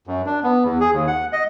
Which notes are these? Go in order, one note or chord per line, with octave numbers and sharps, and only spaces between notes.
F#2
D4
B3
E2
G#4
D#2
F#5
D#5